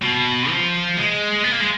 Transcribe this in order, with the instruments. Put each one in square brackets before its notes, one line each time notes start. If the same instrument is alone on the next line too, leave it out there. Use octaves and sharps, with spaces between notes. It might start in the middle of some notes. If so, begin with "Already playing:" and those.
[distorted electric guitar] B2
F3
G#3
B3
A#3
G#3